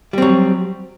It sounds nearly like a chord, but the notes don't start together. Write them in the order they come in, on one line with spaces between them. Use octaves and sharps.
G3 C4 F#3